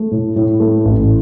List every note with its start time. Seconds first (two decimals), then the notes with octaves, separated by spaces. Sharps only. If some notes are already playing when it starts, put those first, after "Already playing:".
Already playing: A3
0.11 A2
0.36 A2
0.60 A3
0.85 A1